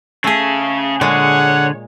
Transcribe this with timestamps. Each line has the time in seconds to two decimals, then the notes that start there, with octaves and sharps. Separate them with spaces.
0.24 C#3 A3 G#4 G#5
1.01 A#2 D3 G#3 G#4 C#5 F#5